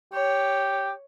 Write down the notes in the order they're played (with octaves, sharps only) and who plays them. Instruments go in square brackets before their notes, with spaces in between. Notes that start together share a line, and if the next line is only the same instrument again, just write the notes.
[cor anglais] G4 [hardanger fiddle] C#5